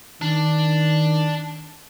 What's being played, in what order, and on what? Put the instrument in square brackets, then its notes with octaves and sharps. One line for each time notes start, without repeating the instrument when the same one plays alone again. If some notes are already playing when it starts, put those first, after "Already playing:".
[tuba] D#3 [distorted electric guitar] D4